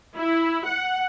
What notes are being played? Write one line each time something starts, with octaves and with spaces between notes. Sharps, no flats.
E4
F#5